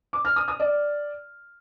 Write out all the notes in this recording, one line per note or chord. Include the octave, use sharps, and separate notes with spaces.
D6
F6
D#6
D#6
D5